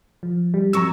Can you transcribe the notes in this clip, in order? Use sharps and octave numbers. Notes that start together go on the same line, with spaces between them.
F3
G3
F2 F#3 A#5 C#6 E6